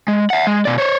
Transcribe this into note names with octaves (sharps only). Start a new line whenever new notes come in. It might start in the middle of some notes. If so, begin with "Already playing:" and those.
G#3
E5 F#5
G#3
B2 D5
C5 C#5